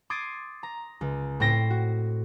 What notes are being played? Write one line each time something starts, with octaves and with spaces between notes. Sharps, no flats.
C6 D6 D#6 G#6 A6 C7
A#5
C#2
A2 C4 G5 A#6 C7
F#4